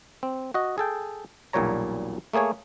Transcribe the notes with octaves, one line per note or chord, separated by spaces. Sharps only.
C4
F#4 D#5
G#4 A4 G5
B1 E2 A#2 G3 C#5 A#5
A3 A#3 G#4 C#5 G#5